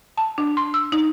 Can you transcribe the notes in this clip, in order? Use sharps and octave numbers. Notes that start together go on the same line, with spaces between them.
A5
D4
C6
E6
D#4